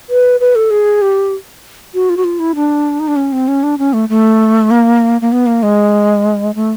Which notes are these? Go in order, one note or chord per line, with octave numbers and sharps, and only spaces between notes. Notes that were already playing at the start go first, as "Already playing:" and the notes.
B4
B4
A4
G#4
G4
F#4
F4
F#4
F4
E4
D4
D#4
D4
C#4
C4
C#4
D4
C#4
A3
A3
A#3
A#3
B3
A#3
G#3
A3